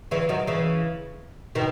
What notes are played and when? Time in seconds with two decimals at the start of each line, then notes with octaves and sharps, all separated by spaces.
0.11 C#3 E3
0.29 D#3 F#3
0.47 C#3 E3
1.55 B2 D#3